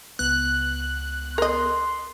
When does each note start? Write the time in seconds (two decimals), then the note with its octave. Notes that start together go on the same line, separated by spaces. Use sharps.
0.19 C#2 B3 F#6
1.38 A#4 D#5 C6